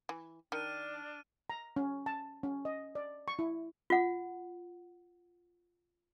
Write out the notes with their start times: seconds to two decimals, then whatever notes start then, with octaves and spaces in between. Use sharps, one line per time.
0.09 E3
0.52 D#3 D4 F6 D#7
1.50 A#5
1.76 C#4
2.06 A5
2.43 C#4
2.65 D#5
2.95 D5
3.28 C#6
3.39 E4
3.90 F4 F#5